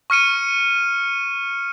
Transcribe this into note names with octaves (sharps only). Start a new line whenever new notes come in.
C#6 F6 C#7 D#7